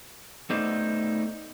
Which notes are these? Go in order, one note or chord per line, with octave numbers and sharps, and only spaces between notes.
A3 B3 D#4 C5 D5